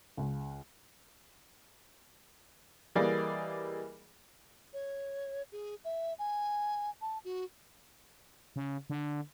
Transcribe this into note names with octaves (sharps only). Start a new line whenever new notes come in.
C#2
E3 G3 A#3 G#4 D5 D#5
C#5
G#4
E5
G#5
A5
F#4
C#3
D3